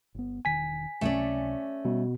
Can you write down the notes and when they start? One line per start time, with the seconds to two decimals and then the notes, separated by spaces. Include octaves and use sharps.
0.15 G1 B3
0.45 E1 D#3 G#5 B6
1.01 C#2 C3 F#3 A3 C#4 D5
1.85 B2 G3